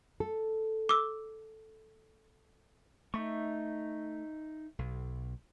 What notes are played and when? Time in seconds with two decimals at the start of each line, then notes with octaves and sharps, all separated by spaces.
0.20 A4
0.89 D6 E6
3.14 A3 D#4 E5 C#6
4.79 B1